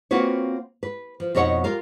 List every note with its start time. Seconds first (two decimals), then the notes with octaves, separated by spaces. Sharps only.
0.11 A#3 C4 F4 F#4 B4 C#5
0.83 B4
1.20 F3
1.35 F2 B2 D#4 C#5 F#5
1.64 F4 G4 A#4 F5